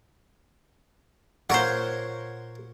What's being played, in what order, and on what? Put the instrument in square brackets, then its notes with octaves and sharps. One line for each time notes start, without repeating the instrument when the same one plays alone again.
[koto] A#2 C5 [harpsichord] A#4 C#5 F#5